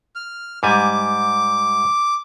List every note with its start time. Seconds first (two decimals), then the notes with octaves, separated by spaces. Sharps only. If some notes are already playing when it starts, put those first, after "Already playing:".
0.16 F6
0.63 G#2 G3 G#5 D6